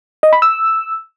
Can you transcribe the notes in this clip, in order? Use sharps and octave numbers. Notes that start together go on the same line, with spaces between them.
D#5
B5
E6